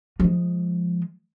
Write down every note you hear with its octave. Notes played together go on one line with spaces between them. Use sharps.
F3 G#3